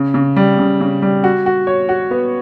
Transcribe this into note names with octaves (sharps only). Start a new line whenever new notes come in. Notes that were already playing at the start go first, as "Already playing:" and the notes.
Already playing: C#3
C#3
G3
C#3
C#3
G3
F#4
F#4
C#5
F#4
B3